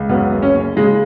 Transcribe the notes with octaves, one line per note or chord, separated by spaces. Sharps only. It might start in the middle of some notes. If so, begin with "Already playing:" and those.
Already playing: C#2
F#2 B3
F#1
C#4
F#1
C#3 G#3